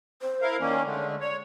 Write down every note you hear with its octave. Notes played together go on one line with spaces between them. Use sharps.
C5
E4 A#4 F5
D#3 A#3 C#4 D5
D3 G#3 A3
C#5 D5